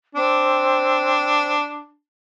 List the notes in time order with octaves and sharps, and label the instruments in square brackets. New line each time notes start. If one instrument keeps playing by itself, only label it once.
[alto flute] C4 [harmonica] D4